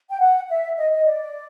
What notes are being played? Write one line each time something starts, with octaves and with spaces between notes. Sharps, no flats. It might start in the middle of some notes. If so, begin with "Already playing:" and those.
G5
F#5
E5
D#5
D#5
D5